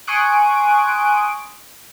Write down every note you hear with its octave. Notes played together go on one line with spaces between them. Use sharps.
G#5 C6 C#6 D#6 F#6 D7